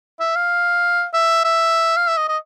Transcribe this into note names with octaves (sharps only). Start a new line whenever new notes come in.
E5
F5
E5
E5
F5
E5
D#5
D#5